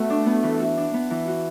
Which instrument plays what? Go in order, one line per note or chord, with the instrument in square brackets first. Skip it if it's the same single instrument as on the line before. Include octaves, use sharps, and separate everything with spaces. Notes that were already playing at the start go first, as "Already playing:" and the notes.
Already playing: [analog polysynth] A3 [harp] B3 F#4
[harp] D4
B3
E3
F#4
D4
B3
E3
F#4